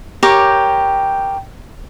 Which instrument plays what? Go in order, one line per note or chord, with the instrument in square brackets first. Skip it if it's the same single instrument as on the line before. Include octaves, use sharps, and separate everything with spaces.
[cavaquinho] G4 A#4 C#5 D6